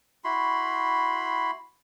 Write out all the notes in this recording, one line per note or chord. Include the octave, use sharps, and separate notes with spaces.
E4 F#4 B5 C6